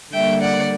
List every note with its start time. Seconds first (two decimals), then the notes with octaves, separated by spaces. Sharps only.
0.12 D3 G3 A#3 E5 G5
0.41 D5 F#5